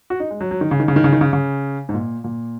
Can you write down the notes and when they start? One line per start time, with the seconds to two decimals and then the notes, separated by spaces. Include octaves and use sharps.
0.10 F#4
0.20 D#4
0.30 G#3
0.41 F#3
0.51 F#3
0.61 D#3
0.71 C#3
0.80 D#3
0.88 C#3
0.96 D#3
1.04 C#3
1.13 D#3
1.21 C#3
1.33 C#3
1.89 G#2
1.94 A#2
2.24 A#2